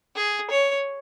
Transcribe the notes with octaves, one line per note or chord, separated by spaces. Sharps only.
G#4
C#5